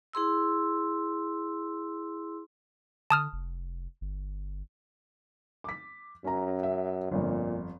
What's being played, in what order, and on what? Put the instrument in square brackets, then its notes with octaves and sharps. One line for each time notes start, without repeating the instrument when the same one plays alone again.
[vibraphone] E4 G#4 C6 E6
[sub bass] D3 [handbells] A5 D#6 F6
[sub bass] F1
G1
[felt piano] D6 B6
[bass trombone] F#2 [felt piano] C#4 A#5
[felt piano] E5
[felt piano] G1 F2 [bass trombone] A#2